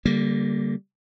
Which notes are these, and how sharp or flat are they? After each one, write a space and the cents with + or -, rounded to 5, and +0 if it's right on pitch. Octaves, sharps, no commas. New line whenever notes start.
D3 -30 G3 +0 A#3 +0